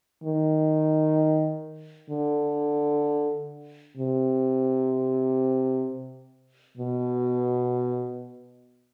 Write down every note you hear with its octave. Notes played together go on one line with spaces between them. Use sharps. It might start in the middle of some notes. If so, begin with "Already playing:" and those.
D#3
D3
C3
B2